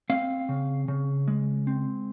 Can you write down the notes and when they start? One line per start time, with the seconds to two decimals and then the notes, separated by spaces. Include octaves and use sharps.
0.10 C4 F5
0.49 C#3
0.88 C#3
1.28 G#3
1.67 C4